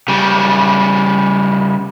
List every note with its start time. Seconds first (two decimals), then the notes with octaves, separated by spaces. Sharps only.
0.08 C#3 G3